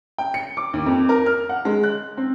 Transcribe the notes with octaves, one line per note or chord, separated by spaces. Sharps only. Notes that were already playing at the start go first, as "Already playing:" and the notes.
G5
C#7
D6
D#2
F2
A#4
F6
F#5
G#3
F#6
C4